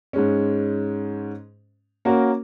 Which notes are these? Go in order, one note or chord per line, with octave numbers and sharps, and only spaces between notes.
G#2 G#3 C#4
A#3 C#4 F#4 A#4